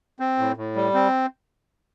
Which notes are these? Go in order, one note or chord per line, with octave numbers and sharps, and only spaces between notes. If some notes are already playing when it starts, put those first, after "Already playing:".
C4
A2
A2
G3
C4